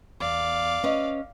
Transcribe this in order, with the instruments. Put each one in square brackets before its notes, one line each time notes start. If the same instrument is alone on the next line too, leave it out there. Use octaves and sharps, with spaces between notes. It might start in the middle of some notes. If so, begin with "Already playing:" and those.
[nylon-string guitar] E2 [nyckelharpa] D5 F5
[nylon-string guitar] C#4 B4 D#5